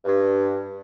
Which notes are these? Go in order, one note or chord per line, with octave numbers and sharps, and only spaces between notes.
G2